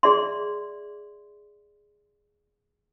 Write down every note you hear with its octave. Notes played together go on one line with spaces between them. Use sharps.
G#4 D5 E5 C6